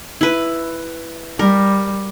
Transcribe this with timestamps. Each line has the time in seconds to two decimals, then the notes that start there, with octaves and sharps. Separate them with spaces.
0.21 E4 B4
1.39 G3 A#4